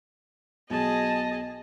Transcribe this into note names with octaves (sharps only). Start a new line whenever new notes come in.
B1 G#4 D#5 A5